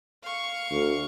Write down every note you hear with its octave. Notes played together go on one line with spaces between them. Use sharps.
F5 C#6
D2